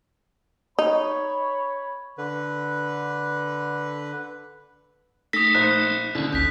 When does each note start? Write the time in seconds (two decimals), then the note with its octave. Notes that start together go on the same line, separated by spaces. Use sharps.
0.79 D#4 C#5 B5
2.18 D3 B4
5.33 A3 D#4 A4 D#6 A#6 B6
5.55 A#1 C5 F#6
6.15 D#2 D3 C#4 D4 E4
6.32 G#1 D2 C#4 G6 B6